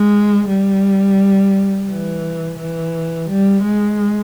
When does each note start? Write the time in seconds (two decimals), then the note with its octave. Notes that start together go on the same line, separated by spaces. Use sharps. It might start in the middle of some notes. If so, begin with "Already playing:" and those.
Already playing: G#3
0.49 G3
1.89 E3
2.59 E3
3.29 G3
3.63 G#3